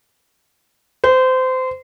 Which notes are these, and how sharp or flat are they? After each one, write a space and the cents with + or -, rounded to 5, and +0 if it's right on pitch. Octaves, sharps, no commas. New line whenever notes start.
C5 -25